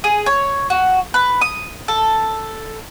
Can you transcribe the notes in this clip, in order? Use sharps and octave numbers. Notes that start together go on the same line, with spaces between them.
G#4
C#5
F#4
B4
D#6
A4